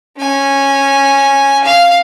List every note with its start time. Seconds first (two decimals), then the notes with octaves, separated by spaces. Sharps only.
0.19 C#4 G#5
1.64 F5